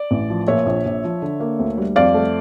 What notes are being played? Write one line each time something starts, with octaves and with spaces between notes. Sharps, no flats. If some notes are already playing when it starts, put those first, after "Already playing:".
Already playing: D5
A1
F3
A#2 C#5 E5
A#1
A#1
F3
D3
A#3
D2
G3
F2 D5 F5
A3